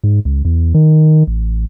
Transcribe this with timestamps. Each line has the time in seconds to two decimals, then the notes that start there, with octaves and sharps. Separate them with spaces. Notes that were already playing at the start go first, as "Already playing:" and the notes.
0.04 G#2
0.25 C#2
0.45 E2
0.74 D#3
1.27 A1